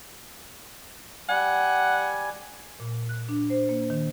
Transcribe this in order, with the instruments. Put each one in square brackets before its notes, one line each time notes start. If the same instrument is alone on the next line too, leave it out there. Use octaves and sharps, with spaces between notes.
[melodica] G3 G#5 [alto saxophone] F#5
[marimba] A#2
F#6
D4
C5
A#3
D#3